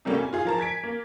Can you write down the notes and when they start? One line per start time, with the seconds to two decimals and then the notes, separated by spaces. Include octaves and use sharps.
0.05 C3 G3 A3 A#3 C#4 F#4
0.18 G#5
0.33 F4 G#4 F5
0.45 F3 A#4 A5
0.58 G#5 G#6 B6 D7
0.83 A#3